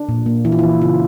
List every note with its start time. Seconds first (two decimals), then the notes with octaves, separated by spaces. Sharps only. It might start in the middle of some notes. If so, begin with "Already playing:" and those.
Already playing: D4
0.09 A#2
0.26 A#3
0.45 E3 E4
0.52 F4
0.59 E3 E4
0.81 C#3 F4